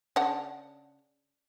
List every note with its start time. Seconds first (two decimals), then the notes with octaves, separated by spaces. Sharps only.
0.16 C#3 D4 F#5